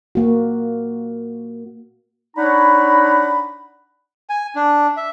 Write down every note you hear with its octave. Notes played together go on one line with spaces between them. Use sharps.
A#3 F#4
D4 D#4 C#5 F#5 A#5 B5
G#5
D4
E5